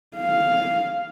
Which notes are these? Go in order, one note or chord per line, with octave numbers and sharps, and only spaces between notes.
F5